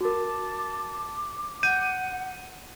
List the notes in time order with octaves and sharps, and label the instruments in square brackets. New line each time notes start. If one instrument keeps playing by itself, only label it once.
[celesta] F#4 A#4 [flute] A5 [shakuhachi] D6
[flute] F#5 [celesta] G6 [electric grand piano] D#7